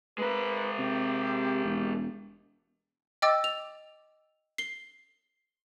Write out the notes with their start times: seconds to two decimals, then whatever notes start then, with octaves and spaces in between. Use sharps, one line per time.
0.18 G#3 A#4 B4
0.79 C3 G4
1.65 E1
3.22 D#5 G5 D6 E6 A6
3.44 F7
4.58 C7 G7